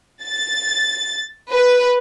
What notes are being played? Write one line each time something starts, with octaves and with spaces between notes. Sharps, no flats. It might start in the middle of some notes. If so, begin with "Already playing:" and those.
A6
B4